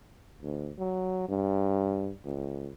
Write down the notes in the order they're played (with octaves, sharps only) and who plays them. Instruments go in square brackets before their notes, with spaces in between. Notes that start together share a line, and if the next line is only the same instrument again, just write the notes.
[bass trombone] D2
F#3
G2
C#2